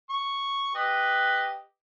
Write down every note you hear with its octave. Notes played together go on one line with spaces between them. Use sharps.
C#6
G4 B4 D#5